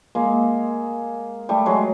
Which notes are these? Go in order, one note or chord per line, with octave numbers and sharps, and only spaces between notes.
G#3 A#3
G3 A3
F#3 G#3